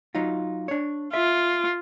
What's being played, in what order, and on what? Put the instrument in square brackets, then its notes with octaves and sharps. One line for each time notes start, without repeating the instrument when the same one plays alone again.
[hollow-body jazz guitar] F#3 D#4 F4
D4 C#5
[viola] F4 [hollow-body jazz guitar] E5